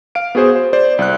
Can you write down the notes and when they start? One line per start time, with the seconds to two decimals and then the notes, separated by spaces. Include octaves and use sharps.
0.15 F5 D7
0.35 B3 F#4 G#4 C5
0.56 C5
0.73 C5 D5
0.99 C2 F#6